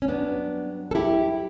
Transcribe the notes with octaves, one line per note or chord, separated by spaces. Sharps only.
C#4
G2 F#3 B3 D4
A4
E4 G4